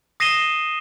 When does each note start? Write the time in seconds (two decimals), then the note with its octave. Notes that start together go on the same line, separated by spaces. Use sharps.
0.20 D#6 A#6 C7 D#7 E7 G7